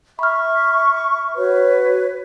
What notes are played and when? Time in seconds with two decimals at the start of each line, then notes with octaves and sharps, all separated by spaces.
0.19 E5 B5 C#6 F6
1.36 F#4 B4 C#5